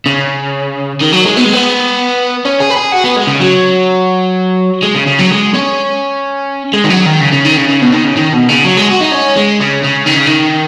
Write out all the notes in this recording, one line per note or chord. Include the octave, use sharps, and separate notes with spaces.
C#3
D#3
F#3
G#3
B3
G#3
B3
C#4
G#4
B4
G#4
F#4
B3
G#3
C#3
F#3
G#3
C#3
C#3
F#3
G#3
C#4
G#3
D#3
F#3
D#3
C#3
C#3
D#3
C#3
C#3
B2
D#3
C#3
D#3
B2
C#3
F#3
G#3
F#4
D#4
C#4
G#3
C#3
C#3
D#3
C#3
D#3